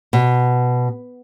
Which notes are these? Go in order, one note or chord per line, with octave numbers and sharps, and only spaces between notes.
B2